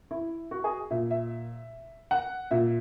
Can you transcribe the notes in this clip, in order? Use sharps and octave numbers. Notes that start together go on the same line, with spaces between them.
E4
F#4
G#4
A#2 E5
E5
F#5
A#2 E5